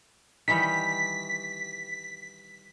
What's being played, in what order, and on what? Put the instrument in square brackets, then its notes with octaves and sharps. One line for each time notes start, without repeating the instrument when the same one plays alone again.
[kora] D#3 E3 G3 [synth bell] B6